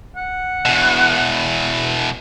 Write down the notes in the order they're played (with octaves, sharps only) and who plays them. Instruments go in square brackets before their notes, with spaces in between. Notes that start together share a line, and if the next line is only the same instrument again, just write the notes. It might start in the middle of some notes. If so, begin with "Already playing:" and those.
[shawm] F#5
[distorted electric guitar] E2 B2